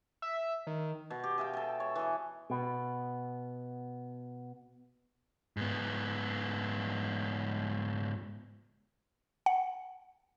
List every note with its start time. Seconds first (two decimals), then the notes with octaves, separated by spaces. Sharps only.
0.22 E5
0.67 D#3
1.10 B2
1.23 G4
1.38 G#4 E5 F5 G5
1.53 A4 G5
1.80 C#5
1.95 E3 G#4
2.50 B2 B3
5.57 G#2 B3
9.46 F#5